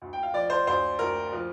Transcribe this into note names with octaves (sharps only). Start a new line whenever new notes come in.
D2
G5
F5
F3 D5
C5
D2 C5
D2 A#4
F3